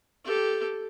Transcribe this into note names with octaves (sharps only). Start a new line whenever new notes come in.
G4 A4